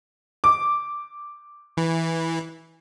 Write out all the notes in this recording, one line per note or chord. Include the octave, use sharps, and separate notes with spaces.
D6
E3